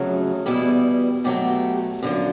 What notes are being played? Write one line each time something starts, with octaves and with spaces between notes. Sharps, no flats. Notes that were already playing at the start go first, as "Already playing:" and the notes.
Already playing: F2 C#3 F#3 A3
E2 B2 G3 E4
B2 F#3 A3 G4
F#2 D3 F3